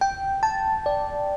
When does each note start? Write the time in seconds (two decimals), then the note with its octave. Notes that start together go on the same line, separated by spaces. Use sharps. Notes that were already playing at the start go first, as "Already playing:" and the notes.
0.01 G5
0.43 A5
0.86 D5